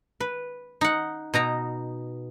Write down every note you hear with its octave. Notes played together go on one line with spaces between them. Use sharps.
B4
D#4 F#5
B2 D#4 A#5